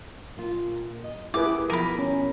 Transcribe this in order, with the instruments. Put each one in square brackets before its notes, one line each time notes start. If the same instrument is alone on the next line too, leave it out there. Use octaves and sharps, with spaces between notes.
[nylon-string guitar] A#2 F4
D#5
[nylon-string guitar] A#3 G4 [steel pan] E4 G#4 B4 [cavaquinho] D6
[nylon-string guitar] B2 F3 [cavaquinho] A#4 B5
[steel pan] C#4